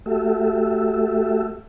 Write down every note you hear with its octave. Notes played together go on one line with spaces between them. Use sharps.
A3 F#4 G4 A4 E5